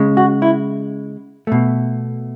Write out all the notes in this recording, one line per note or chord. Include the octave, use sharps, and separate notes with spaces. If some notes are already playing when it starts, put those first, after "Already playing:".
Already playing: C#3 G#3
F#4
E4
B2 A3